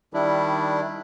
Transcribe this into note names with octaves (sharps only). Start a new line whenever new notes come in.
D#3 G3 D4 E4